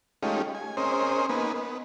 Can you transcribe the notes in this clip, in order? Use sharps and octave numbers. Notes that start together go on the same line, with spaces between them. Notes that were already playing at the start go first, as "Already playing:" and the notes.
G#3 A3 C#4 D#4 F4 G4
G#5
C4 C#4 G#4 A#4 C5 D#5
A#3 B3 D#4 B4 G#5
B3